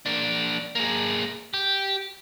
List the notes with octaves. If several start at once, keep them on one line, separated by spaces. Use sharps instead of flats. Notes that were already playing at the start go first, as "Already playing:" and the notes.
A#3 D4
A#3 G#4
G4